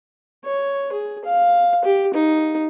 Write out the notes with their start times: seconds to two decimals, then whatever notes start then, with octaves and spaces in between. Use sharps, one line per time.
0.44 C#5
0.92 G#4
1.25 F5
1.84 G4
2.14 D#4